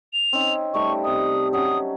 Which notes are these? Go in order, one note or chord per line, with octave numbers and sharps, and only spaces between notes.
F7
C4 C#4 D#4
G3 A3 D#4 C#6
C3 D#4 D#6
F#3 C#4 D#6